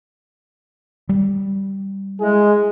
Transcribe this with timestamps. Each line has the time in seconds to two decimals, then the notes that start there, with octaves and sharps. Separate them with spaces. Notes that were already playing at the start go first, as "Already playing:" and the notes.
1.09 G3
2.21 G#3 E4 G#4